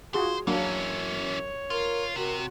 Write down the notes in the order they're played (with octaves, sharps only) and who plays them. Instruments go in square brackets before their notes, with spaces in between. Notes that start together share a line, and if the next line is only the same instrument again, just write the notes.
[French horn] F4 [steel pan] F#4 G#4 [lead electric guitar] C5
[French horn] F#2 [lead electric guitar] E3 C#4 [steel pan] F#3 A#3 D4 [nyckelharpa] C#5
[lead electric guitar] F4 [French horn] A#4
[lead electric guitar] C3 [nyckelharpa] F#4 [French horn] A#4